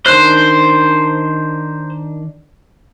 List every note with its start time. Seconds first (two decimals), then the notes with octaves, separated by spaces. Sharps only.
0.06 D#3 D4 C5 F#6